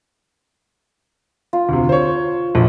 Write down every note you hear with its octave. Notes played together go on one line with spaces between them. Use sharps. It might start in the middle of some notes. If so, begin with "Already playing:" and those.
F4
D2 C3
C5 C#5
A#1